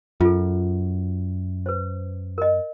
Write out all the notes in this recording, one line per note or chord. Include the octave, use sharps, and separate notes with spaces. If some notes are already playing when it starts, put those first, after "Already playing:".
F#2 F4 A4
B4 C5
A#4 D#5